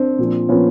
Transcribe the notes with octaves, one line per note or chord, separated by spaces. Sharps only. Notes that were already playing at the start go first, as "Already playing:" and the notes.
Already playing: C4 D4
A#2 F3
A#2 F3 B3 C#4